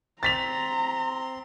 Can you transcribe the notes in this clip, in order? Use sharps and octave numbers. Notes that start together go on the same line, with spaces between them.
C4 A#5 C6 A6 B6 F7